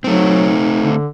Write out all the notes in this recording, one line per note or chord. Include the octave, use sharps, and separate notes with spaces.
F#3 A3 C4 D#4
D3